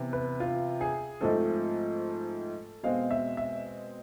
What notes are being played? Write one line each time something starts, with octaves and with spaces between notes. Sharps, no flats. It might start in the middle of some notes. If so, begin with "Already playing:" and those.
Already playing: C3 E3 B3
B4
F4
G#4
G#2 F3 A3 C4 A4
B2 G#3 C4 F5
E5
E5